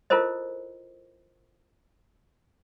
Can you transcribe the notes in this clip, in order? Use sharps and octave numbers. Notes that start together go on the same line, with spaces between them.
E4 F4 A4 A#4 C5 D#5